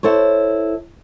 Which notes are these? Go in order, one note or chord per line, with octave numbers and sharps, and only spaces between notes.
E4 A4 C5 C#5